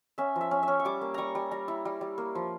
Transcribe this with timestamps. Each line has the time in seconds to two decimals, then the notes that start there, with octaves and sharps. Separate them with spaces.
0.18 C#4 E5
0.36 F3
0.41 E5
0.51 C#4
0.63 E5
0.68 C#4
0.80 C#6
0.85 G3 D6
1.01 A#3
1.14 G3 A#5 C#6
1.35 G3
1.51 G3 A#5
1.68 E4
1.85 G3
2.01 G3
2.18 A#3
2.35 F3